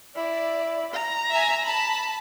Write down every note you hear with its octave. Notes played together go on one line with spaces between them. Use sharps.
E4 D5
A#5
E5 G#5
A5 B5